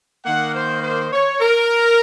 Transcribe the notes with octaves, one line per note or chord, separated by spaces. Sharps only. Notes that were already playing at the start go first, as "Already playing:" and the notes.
D#3 A#3 F#5
C5
C5
C#5
A#4